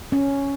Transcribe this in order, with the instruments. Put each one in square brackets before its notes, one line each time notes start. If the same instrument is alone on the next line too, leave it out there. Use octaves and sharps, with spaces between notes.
[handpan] C#4